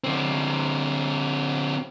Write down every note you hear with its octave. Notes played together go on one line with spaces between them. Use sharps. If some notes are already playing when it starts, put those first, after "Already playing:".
D3 C4